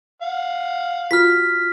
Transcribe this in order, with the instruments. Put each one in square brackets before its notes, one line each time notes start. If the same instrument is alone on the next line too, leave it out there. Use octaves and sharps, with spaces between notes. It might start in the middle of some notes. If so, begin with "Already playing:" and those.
[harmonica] F5 F#5
[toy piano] F4 F#4 [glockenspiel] F6 B6